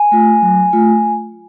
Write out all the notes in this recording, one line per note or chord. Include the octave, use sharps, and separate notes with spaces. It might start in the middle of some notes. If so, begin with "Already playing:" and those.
Already playing: G#5
A3 F4
F#3
A3 F4